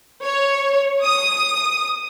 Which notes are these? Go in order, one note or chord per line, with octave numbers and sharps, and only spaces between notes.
C#5
D#6